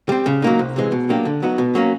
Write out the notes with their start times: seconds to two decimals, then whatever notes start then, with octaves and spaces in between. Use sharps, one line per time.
0.09 G3 C4
0.26 C#3
0.42 F#3 A#3 D#4
0.59 C2
0.76 C3 E3 G#3
0.92 B2
1.09 F#3 A#3 D4 G4
1.25 D3
1.42 F#3 B3 D#4 F#4
1.58 B2
1.75 F#3 A#3 C#4